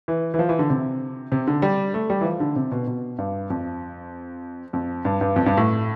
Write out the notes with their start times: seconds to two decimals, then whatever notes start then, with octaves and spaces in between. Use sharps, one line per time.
0.08 E3
0.34 E3
0.39 F3
0.49 E3
0.59 D3
0.70 C3
1.32 C3
1.47 D3
1.62 G3
1.94 A3
2.10 G3
2.21 E3
2.25 F3
2.40 D3
2.56 C3
2.72 B2
2.87 B2
3.18 G2
3.50 F2
4.73 F2
5.05 G2
5.21 G2
5.36 F2
5.46 G2
5.57 A2